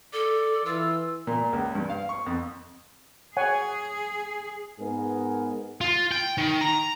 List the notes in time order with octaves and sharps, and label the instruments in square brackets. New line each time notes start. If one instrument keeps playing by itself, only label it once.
[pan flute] A4 [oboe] D5
[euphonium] E3 [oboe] F4 [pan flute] E6
[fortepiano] A#2
C#2
G2
F5
C#6
F2
[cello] G#4 [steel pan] C#5 F#5 G#5
[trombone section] G#2 B3 G#4 A#4
[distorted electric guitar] F4
G5
D#3
A#5